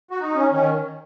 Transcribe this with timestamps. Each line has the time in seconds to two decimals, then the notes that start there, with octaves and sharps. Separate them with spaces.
0.11 F#4
0.20 D#4
0.35 C#4
0.51 D#3 C#4